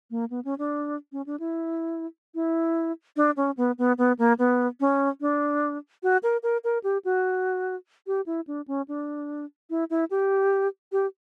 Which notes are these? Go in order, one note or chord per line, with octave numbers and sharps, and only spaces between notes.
A#3
B3
C#4
D4
C#4
D4
E4
E4
D4
C#4
B3
B3
B3
A#3
B3
C#4
D4
F#4
A#4
A#4
A#4
G4
F#4
G4
E4
D4
C#4
D4
E4
E4
G4
G4